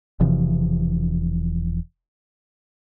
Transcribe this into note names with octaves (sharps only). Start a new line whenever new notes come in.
E1 C3 E3 F3